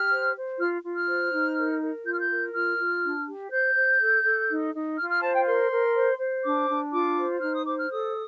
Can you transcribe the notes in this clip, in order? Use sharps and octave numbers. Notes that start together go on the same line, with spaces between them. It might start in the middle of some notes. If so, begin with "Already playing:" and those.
Already playing: G4 F6
C5
C5
F4 F6
F4
F6
C5
D#4
A#4
A#4
F4 G6
F6
G6
A#4
F4 F6
F4
D4
G4
C5 G6
C5
A4
A4
D#4
D#4
F4 F6
F6
C5 A5
G5
A#4 C6
A#4
C5
C5
D4 D6
D4
F4 D6
C5
D#4 F6
D#6
C5 D6
F6
A4 D#6